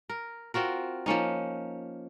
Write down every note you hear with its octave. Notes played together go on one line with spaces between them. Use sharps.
A#4
C4 F4 F#4 A#4
F3 A#3 C#4 D#4